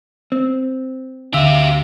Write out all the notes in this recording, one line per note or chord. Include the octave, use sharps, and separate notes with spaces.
C4
D2 D3 G4 E5 F5